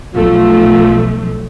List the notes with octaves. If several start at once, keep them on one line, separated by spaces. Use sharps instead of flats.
B1 F3 A3 F4